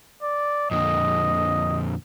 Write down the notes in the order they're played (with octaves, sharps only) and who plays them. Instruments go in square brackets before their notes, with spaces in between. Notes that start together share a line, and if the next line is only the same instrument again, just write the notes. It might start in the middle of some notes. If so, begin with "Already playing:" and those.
[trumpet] D5
[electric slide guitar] F2 A#2 D3 [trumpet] D#5